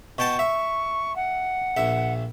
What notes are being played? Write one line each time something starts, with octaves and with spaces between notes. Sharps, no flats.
B2 G5 A5 C#6
E5
F#5
A#1 E5